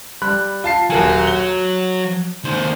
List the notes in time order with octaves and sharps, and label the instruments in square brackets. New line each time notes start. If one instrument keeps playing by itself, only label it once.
[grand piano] G3 B5 F#6
F4 A5 C7
[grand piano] D#1 A#4 G#5 [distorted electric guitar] F#3
[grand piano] G7
[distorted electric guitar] D#2 C5